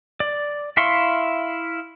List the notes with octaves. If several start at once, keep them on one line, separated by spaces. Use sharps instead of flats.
D5
E4 E5 F5 C6 C#6